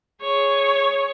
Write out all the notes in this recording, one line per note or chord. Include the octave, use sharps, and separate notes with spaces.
G#4 C#5